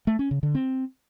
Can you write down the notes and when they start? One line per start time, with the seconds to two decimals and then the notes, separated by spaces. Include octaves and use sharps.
0.07 A3
0.19 C#4
0.31 C#3
0.43 D3
0.55 C4